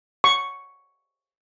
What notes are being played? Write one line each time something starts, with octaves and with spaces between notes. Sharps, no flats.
C#6